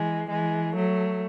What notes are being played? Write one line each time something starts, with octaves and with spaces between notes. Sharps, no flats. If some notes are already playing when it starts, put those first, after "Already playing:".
Already playing: E3 G#3
E3 G#3
F#3 A3